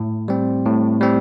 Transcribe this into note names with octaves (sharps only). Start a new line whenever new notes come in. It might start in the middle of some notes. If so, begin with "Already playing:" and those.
Already playing: A2
G3 C4
A2
G3 C4